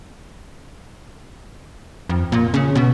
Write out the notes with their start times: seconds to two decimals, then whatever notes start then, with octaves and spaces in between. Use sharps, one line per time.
2.09 F2
2.32 A#2
2.54 C#3
2.75 B2